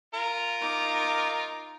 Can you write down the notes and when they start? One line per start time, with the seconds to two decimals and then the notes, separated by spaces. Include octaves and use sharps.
0.14 F4 A#4
0.61 D#4 D6